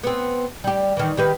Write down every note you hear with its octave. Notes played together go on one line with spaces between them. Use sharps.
B3 C4
G3 G4
D#3 E3
D#3 G4 B4